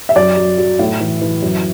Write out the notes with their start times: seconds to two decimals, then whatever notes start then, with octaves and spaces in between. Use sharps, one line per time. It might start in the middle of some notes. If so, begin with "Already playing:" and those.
0.09 E5
0.16 F#2 D5
0.37 F#3
0.58 F#3
0.79 A2
1.00 E3
1.21 E3
1.42 F#2